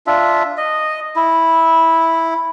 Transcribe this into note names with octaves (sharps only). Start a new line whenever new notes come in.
D4 F4 E5
D#5
E4